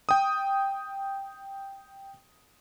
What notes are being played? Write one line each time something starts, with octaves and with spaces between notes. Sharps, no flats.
G5 D#6